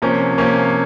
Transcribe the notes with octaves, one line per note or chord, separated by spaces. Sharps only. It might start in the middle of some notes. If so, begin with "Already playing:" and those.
C3 F3 A#3 C#4
C3 F3 A#3 C#4